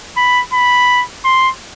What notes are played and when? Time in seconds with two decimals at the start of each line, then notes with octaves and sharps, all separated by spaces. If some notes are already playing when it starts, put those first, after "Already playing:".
0.17 B5
0.53 B5
1.25 C6